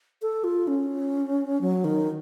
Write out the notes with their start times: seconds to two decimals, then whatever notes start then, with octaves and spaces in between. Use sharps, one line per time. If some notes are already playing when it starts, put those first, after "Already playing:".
0.22 A4
0.44 F4
0.67 C#4
1.61 F#3
1.84 D#3